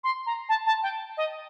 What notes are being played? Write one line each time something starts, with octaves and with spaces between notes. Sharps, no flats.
C6
A#5
A5
A5
G5
D#5